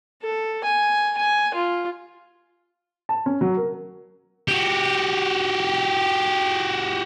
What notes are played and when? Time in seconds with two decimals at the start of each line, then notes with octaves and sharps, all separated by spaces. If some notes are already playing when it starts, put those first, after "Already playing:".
0.22 A4
0.64 G#5
1.17 G#5
1.54 F4
3.09 A5
3.26 C#4
3.41 F#3
3.57 A#4
4.48 F#4 G4